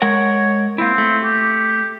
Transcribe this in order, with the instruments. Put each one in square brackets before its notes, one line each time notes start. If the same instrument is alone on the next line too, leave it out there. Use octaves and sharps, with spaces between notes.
[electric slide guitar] G#3 A#4 F#5 [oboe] C#5
[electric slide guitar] A#3 E4 [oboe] C4
[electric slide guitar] A3
[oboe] G4